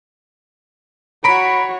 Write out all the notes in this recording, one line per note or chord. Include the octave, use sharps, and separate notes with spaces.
F#4 C#5 A#5 B5 B6 D7